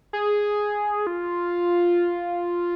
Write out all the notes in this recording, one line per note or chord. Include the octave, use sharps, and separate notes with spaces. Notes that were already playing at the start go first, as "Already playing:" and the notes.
G#4
F4